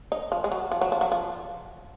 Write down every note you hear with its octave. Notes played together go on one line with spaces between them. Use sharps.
D#4
F3
G#3
F#3
F3
F#3
F3
F#3
F3